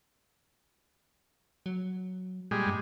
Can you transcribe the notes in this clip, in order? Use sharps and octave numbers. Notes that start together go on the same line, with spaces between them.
F#3
A#2 G3 G#3
G2